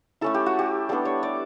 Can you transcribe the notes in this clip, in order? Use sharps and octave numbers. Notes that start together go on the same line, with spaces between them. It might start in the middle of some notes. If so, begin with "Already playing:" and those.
A3 C#4 E4 A4
G4
F#4
G4
G3 B3 D4 A4
C#5
D5